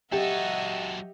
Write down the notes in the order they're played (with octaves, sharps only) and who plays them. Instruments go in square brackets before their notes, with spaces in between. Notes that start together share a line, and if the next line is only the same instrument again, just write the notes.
[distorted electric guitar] F#3 A4 [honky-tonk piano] G4 [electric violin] D#5 E5 [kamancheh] F#5